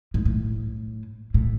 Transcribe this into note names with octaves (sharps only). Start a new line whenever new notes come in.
G#2
A2
A2